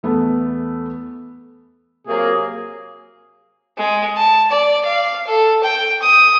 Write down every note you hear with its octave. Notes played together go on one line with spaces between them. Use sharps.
E2 A3 B3
C3 F#3 A#3 G#4
G#3
A5
D5
F5
A4
G5
D#6